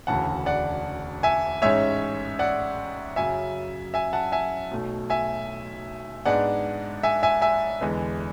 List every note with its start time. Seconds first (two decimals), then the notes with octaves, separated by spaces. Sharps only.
0.07 E1 D2 C#3 E3 F#5 A5
0.46 D5 F#5
1.23 E5 G#5
1.62 A1 G#2 G#3 C#4 C#5 E5
2.39 D5 F#5
3.16 F#2 C#3 F#3 E5 G#5
3.94 E5 G#5
4.13 F#5 A5
4.32 E5 G#5
4.71 B1 B2 A3
5.10 E5 G#5
6.25 G#2 G#3 B3 D4 D5 F#5
7.03 E5 G#5
7.23 E5 G#5
7.41 E5 G#5
7.81 E2 D3 G#3 B3 D4